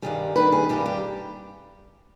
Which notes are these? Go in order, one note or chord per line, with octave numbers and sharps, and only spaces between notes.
G2 D#3 G3 G#4
G2 D#3 G3 B4
G#4
G2 D#3 G3 G4
G4